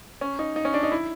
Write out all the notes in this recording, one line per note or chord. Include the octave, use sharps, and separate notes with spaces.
C#4
D#4
D#4
C#4
D4
D#4
E4